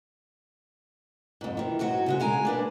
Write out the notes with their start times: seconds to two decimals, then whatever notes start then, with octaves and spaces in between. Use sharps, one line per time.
1.41 F2 G#2
1.57 D#3 E3
1.79 G#2 F#3 F#4 C5
2.06 C#3 G#3 F#4
2.20 C#3 G#3 G#5 A#5
2.45 A#3 D4 B4